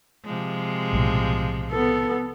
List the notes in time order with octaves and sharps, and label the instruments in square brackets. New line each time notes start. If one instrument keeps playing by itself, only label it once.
[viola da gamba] C3 F3 G#3
[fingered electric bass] B1 A2
[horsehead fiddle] B3 A4